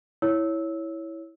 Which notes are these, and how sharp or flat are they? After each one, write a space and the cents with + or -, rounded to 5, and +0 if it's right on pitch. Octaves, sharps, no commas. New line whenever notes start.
E4 -5 C#5 +0 E6 -15